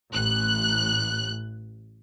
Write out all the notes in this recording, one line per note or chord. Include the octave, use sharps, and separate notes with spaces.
A1 F#6